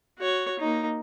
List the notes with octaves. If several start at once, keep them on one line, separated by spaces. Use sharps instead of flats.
F#4 C#5
A#3 D#4